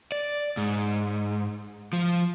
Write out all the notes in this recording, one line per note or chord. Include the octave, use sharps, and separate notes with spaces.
D5
G#2
F3